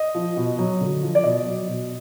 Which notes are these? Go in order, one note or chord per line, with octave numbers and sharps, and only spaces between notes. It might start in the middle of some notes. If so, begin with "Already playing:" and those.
Already playing: D#5
F3
B2
F#3
D3
F3
D5
B2 D#5
F#3
B2